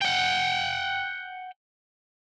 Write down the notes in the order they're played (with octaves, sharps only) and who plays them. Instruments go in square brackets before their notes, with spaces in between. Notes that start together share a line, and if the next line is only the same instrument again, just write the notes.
[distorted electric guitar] F#5 G5